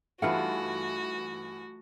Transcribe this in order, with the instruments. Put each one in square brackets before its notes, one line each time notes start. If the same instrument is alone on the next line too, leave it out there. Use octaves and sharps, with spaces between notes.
[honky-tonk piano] G2 E3 [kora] A3 F4 B4 [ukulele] D#4 F#5 [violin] F#4